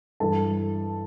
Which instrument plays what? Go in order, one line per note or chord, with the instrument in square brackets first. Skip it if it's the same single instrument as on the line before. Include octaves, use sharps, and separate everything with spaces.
[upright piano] G2 E3 A4 A5